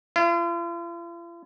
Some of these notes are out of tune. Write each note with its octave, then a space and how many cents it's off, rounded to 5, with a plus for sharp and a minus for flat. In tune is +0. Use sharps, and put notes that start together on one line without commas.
F4 -45